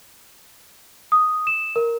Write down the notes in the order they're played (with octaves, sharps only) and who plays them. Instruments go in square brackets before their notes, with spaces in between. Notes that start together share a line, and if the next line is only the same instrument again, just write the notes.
[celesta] D#6
E7
A#4